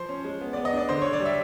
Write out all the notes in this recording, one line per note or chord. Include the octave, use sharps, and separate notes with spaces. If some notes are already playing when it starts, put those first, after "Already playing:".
Already playing: F3 C5
C#4
G#3
B3
B3 D5
D#5
D4 D5
D3 C5
D3 C#5
D5
G3 E5